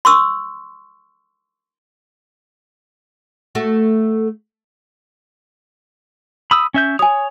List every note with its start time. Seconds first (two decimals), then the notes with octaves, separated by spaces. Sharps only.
0.05 C6 C#6 E6
3.55 A3 F#4 A4
6.51 B5 D#6 E6
6.74 C#4 E5 G6
6.99 C#5 G#5 D#6